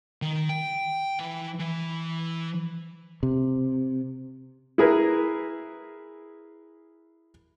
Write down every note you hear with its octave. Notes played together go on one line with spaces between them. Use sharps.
D#3
G5
E3
E3
C3
E4 G#4 A#4 B4